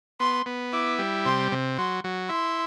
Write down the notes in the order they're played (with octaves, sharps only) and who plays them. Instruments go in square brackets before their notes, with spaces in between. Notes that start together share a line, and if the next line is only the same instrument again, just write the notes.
[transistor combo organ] B3 [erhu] C6
[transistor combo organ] B3
[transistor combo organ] E4 [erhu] D6
[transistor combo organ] G3
[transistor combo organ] C3 [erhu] C6
[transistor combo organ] C3
[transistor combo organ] F#3 [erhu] C6
[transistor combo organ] F#3
[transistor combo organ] E4 [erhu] C6